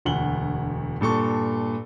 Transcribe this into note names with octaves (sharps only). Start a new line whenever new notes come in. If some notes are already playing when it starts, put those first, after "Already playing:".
E1 D2 F#5 F#7 G7
G2 A#2 A4 C#6